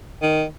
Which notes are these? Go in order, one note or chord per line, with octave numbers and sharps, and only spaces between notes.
D#3